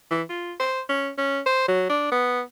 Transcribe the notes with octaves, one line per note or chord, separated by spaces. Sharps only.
E3
F4
C5
C#4
C#4
C5
F#3
D4
B3